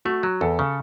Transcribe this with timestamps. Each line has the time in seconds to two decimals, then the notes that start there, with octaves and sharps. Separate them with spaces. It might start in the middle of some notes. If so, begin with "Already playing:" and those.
0.05 A3 F#4
0.23 F#3
0.41 E2 A4
0.59 C#3